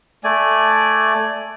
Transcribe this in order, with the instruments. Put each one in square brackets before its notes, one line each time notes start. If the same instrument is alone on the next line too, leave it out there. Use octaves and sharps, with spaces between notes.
[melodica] A3 D5 G#5